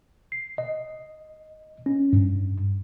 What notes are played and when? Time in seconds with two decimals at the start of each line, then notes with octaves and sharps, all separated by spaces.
0.32 C7
0.58 D#5
1.86 C#4
2.13 G2